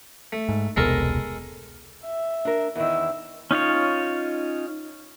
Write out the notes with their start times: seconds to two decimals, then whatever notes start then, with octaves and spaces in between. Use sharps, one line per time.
0.33 A3
0.49 G#2
0.77 E1 C2 B2 G#3 A4 A#4
2.04 E5
2.45 D4 A#4
2.75 E2 D#3 E4 E6
3.51 C#4 D#4 F4 C#5